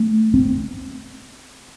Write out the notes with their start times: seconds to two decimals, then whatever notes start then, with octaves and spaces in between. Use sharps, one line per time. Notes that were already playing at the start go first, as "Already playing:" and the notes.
Already playing: A3
0.34 C4